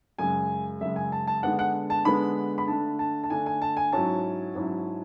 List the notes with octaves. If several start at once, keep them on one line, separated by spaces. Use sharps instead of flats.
F#2 C#3 G#3 G#5
F#2 C#3 G#3 E5
G#5
A5
A5
D3 G#3 B3 D4 F#5
F#5
A5
D3 G#3 B3 D4 B5
B5
D3 A3 D4 A5
A5
A5
D3 A3 D4 G#5
G#5
A5
G#5
G#2 F#3 C#4 E4 A5
G#2 F#3 C#4 E4